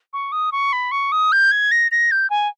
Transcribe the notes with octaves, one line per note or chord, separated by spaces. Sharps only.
C#6
D#6
C#6
B5
C#6
D#6
G6
G#6
A#6
A#6
G6
G#5